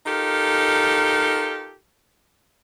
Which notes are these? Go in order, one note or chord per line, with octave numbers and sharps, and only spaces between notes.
D#4 F4 G4 A4 A#4